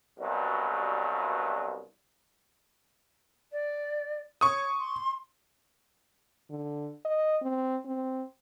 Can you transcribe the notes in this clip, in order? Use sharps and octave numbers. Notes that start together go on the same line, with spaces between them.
C2 G2 B2 F#3
D5
C#5 C#6 D#6
C6
D3
D#5
C4
C4